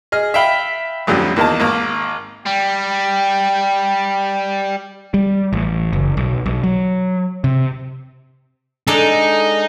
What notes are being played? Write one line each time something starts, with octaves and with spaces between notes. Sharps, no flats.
G#4 D#5 F6
E5 F5 G5 B5 F6
A1 F2 D3 F#3 G3
E2 D#3 A#3 D#5 A5
G#1 A#3
G3 G5
G3
A1
F#1
B1
B1
F#3
C3
G#3 D4 D#4 A4